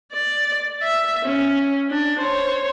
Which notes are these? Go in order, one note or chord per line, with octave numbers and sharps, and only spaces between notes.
D5
E5
C#4
D4
C5 C#5